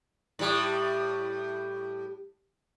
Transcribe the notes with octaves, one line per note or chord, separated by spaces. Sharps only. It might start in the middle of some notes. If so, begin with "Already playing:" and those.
A2 G3